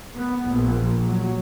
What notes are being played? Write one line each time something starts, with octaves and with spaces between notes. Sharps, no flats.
B3
A#1
F#3